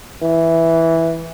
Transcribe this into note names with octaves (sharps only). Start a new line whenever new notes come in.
E3